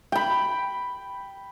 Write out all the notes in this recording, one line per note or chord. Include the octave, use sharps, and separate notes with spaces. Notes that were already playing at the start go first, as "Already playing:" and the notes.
G5 B5